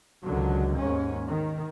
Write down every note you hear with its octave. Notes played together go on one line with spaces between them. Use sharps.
C#2 D3 D#3 F#3
D#2 G#2 C#4
D#3